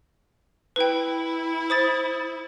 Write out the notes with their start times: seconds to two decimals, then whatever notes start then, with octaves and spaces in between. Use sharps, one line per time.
0.76 E4 B4 G5
1.70 C5 D#6 A6